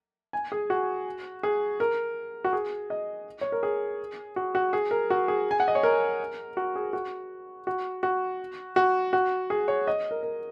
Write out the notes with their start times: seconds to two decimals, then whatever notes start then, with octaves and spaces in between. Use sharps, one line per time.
0.33 G#5
0.52 G#4
0.70 F#4
1.43 G#4
1.80 A#4
2.44 F#4
2.53 G#4
2.90 D#5
3.41 C#5
3.52 A#4
3.63 G#4
4.36 F#4
4.55 F#4
4.73 G#4
4.91 A#4
5.10 F#4
5.28 G#4
5.51 G#5
5.60 F#5
5.68 D#5
5.75 C#5
5.83 A#4
6.57 F#4
6.76 G#4
6.93 F#4
7.67 F#4
8.03 F#4
8.76 F#4
9.13 F#4
9.50 G#4
9.68 C#5
9.87 D#5
10.11 A#4
10.23 A#4